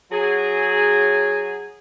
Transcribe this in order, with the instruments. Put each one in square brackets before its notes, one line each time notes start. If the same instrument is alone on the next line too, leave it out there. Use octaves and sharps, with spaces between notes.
[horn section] F#3 G#4